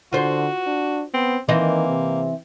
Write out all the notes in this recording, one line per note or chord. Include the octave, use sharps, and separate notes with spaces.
D3 F4 F#4 C5
D4
B3 C4
D#3 E3 A#3 C4 D#5
C3